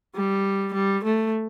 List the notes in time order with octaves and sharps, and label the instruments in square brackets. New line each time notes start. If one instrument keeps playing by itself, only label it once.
[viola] G3
G3
A3